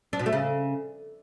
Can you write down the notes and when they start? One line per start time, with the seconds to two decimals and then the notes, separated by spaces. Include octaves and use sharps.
0.13 D4
0.19 B2
0.26 A3
0.33 C#3